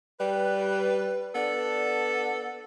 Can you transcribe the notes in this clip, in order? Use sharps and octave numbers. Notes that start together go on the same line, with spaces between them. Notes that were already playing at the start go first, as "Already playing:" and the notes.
G3 B4
B3 D4 A4 D5